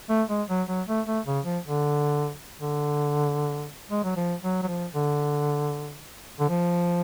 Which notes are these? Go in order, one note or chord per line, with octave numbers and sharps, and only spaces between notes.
A3
G#3
F#3
F#3
A3
A3
C#3
F3
D3
D3
G#3
F#3
F3
F#3
F#3
F3
D3
D3
F3